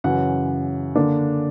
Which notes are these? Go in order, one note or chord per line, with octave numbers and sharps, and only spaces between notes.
F#2 C#3 E3 F#5
D3 A#3 D4